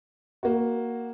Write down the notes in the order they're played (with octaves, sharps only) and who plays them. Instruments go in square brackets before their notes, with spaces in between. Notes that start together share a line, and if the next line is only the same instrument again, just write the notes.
[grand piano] A#3 F#4